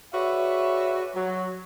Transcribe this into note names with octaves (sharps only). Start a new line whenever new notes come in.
F#4 G#4 B4 C#5 D5 E5
F#3